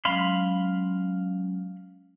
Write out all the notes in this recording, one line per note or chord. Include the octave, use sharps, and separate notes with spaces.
F#3 G#3 C#4 F5 B5 C6